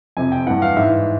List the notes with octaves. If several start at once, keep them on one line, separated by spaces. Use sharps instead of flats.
F2 C3 F3 G#5
G5
G2 E3 F#5
F5
G#2 E3 E5